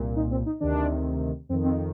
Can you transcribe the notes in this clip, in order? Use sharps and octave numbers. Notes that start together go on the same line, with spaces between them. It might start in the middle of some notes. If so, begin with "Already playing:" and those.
Already playing: C2 A#2
D#4
C4
D#4
D2 C3 D#3 D4
F2 D#3 C4
C4